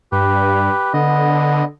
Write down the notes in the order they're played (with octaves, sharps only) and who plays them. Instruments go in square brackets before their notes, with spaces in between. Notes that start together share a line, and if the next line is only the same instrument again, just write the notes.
[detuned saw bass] G2 [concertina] G4 B4
[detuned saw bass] D3 [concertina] B3 D#5